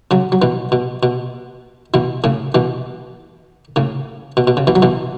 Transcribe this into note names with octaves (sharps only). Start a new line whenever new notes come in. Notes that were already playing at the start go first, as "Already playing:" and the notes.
C#3 F#3
F#3
B2 E3
B2
B2
B2 E3
A2 C#3
B2 E3
A2 C#3
B2
B2
C#3
B2 E3
F#3
B2 E3